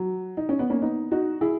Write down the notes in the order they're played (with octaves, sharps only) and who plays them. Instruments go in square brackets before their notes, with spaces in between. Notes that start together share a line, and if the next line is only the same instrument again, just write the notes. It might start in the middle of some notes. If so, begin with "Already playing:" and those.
Already playing: [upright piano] F#3
D#4
C#4
B3
A#3 C#4
B3 D#4
D#4 F#4
E4 G#4